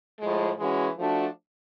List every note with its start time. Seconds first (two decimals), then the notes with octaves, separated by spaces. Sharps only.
0.20 A2 F3 G#3
0.59 E3 G#3 C#4 F#4
0.96 F3 A3 D4 F#4